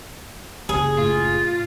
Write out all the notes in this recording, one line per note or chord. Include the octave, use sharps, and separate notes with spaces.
F#1 G#4
A2 F4